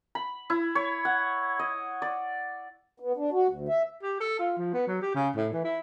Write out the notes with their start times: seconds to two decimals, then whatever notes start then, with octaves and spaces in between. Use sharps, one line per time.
0.15 B5
0.50 E4
0.75 C#5
1.05 F#5
1.59 D#5
2.02 D5
3.00 B3
3.16 D4
3.32 F#4
3.48 D2
3.68 E5
4.03 G4
4.20 A4
4.39 F4
4.58 F3
4.74 B3
4.87 F#3
5.02 G4
5.15 C#3
5.36 A2
5.53 E3
5.64 E4